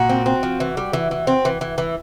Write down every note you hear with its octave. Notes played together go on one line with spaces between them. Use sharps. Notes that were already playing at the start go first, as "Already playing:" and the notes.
Already playing: A#2 F#4
C4
C4
F3
E3
G3
E3
E3
C4
E3
E3
E3